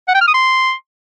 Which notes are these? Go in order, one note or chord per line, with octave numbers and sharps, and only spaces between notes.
F#5
G5
F6
D#6
C6